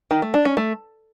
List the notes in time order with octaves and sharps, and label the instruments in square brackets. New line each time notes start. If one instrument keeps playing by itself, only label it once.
[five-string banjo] D#3
A3
D4
C#4
A3